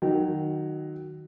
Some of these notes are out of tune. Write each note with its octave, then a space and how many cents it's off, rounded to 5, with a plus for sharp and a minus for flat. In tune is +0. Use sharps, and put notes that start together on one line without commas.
D#3 -15 F#3 +0 G5 -15